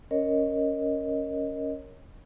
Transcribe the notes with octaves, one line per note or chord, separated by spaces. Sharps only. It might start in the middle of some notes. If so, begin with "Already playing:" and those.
C#4 A#4 C#5 D#5